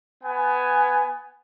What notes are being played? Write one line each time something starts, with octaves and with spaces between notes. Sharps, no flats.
B3 G#5